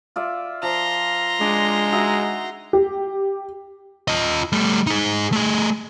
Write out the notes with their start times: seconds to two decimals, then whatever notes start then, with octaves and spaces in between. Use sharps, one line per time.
0.16 F4 D5 E5
0.63 F3 A#5 C6
1.41 G#3 D4 D6
1.92 D#4 F#4 E5
2.73 G4
4.08 F4 D#5
4.52 G3 A3
4.87 D#4 G#4
5.32 A3 G#4